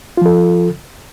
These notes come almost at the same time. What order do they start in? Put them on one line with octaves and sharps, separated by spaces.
F4 F3 A4